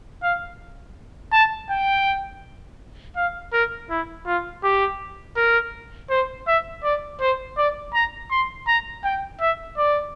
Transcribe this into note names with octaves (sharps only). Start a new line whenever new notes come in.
F5
A5
G5
F5
A#4
E4
F4
G4
A#4
C5
E5
D5
C5
D5
A#5
C6
A#5
G5
E5
D5